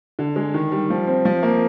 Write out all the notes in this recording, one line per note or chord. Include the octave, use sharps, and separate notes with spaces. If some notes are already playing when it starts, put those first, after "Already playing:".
D3
G#3
D#3
G3
F3
C4
F3
A#3